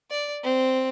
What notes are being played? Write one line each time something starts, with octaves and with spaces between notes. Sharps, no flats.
D5
C4